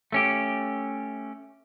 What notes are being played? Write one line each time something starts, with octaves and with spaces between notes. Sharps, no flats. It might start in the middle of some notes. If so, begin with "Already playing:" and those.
A3 C#4 G4